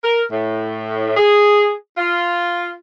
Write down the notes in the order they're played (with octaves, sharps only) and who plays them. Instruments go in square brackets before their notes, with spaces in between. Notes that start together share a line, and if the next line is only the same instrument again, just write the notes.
[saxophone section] A#4
A2
G#4
F4